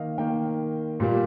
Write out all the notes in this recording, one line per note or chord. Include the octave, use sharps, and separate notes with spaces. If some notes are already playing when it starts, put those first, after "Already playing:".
Already playing: D#3 A#3 D#5 F5
D#3 A#3 G5
A#2 G3 A#3